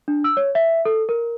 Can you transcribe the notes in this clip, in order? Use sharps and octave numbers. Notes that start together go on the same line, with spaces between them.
D4
E6
C#5
E5
A4
A#4